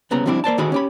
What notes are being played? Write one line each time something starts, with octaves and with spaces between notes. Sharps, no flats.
C2 C#3 B3 A#5
F3 G3 C4 D4 E4
A#3 C5 D5 A5
D3 D#3 F#4 G#4 C5 B5
C#4 G4 B5